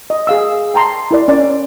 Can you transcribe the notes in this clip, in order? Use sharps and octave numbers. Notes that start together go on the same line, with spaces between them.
D#5
G#4 F5 E6
G5 A5 A#5 C6
E4 A#4 D5
C#4 D5